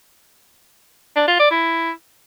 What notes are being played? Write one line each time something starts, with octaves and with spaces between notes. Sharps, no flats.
D4
F4
D5
E4